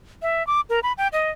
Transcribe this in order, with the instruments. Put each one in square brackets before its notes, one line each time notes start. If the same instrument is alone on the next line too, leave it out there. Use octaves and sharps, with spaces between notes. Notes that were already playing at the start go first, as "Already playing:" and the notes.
[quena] E5
D6
A#4
B5
G5
D#5